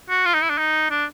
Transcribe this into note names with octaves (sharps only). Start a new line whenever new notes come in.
F#4
F4
D#4
E4
D4
D#4
D4